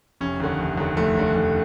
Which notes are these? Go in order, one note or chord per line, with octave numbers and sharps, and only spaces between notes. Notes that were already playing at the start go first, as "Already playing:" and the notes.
F1 C#4
D#2 D3
F1
D#2 D3
F1 A3
D#2 D3
F1